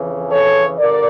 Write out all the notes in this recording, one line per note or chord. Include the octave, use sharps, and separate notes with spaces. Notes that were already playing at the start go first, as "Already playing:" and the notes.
Already playing: F2 C#3 E3
A4 C#5
G2 D3 A#4 D5